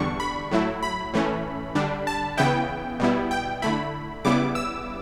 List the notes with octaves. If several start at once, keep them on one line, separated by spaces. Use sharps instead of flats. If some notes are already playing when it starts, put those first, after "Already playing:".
Already playing: E2 D3 G3 D4 C#6
B5
A2 F#3 A3 E4
B5
A2 E3 A3 C#4
D3 G3 D4
A5
C#3 E3 B3 E4 G5
B2 G3 B3 E4
G5
D3 A3 E4 B5
C#3 G3 B3 E4 D6
E6